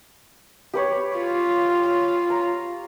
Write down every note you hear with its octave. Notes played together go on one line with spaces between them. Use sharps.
G4 B4 C#5
F4
A#5